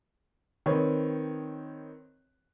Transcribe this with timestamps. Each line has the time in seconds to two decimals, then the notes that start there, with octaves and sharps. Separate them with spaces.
0.66 D#3 C4 B4 C#5